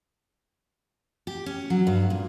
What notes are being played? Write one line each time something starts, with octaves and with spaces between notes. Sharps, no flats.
G4
C#4
F#3
G2
A#2